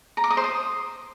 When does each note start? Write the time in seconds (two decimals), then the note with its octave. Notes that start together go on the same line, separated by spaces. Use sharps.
0.17 A#5
0.24 D6
0.30 D#6
0.37 C5
0.44 D#6